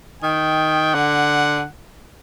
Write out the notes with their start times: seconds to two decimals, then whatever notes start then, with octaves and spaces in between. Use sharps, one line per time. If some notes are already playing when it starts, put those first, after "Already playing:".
0.23 D#3 G5
0.94 D3 F#5